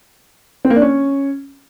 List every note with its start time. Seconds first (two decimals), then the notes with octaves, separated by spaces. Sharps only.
0.65 C4
0.70 A#3
0.76 D4
0.82 C#4